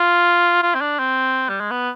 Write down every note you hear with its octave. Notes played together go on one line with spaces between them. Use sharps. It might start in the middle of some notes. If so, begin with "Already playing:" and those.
Already playing: F4
F4
C4
D4
C4
G3
G#3
B3